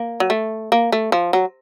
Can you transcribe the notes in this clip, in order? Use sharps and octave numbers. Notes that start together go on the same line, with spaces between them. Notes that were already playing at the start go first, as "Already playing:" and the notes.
Already playing: A#3
F#3
A3
A#3
A3
F3
F#3